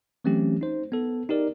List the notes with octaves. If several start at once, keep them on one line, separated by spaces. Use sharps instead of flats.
E3 F#3 A3 C4 C#4 G4
D#4 C5
B3 A4
D#4 G4 A#4 D5